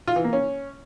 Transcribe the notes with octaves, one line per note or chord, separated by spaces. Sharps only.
F4
E3
A#3
C#4